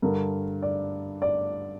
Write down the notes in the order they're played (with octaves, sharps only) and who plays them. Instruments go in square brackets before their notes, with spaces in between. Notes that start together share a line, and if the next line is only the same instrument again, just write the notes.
[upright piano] G2 D3 A#4
D5
D5